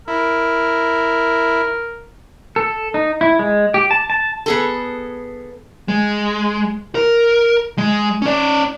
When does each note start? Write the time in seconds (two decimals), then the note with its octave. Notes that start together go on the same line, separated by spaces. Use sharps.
0.08 E4 A#4
2.56 A4
2.94 D#4
3.21 E4
3.39 G#3
3.74 G4
3.91 A5
4.10 A5
4.46 B3 G#4 A4
5.88 G#3
6.95 A#4
7.78 G#3
8.22 C#4 D5